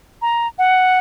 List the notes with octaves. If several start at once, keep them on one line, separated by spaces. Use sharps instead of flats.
A#5
F#5